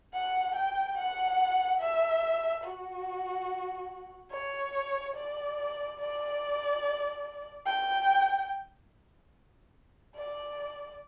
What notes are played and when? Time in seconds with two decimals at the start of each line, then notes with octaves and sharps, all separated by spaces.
0.14 F#5
0.56 G5
0.98 F#5
1.80 E5
2.64 F#4
4.31 C#5
5.15 D5
5.99 D5
7.66 G5
10.16 D5